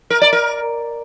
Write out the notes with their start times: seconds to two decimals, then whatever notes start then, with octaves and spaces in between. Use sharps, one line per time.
0.10 A#4
0.22 D5
0.33 A#4